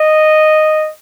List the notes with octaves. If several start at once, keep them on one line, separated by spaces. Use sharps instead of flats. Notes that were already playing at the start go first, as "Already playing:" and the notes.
Already playing: D#5